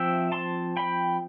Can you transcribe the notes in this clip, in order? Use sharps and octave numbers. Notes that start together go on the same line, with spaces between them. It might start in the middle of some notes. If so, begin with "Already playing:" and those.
Already playing: F3 C4 E5 G5
A5 C6
G5 B5